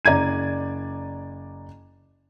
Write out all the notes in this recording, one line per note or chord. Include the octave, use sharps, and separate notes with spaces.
F#1 D5 A#5 G#6 D#7